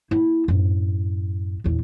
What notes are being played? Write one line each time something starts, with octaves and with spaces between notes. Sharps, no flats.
A#3 E4
F#2 A2
A#1 E2